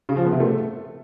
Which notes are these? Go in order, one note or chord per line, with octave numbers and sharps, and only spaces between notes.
C#3
F3
B3
C3
A3